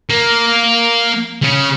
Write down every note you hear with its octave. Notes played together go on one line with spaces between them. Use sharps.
A#3
C#3 C#4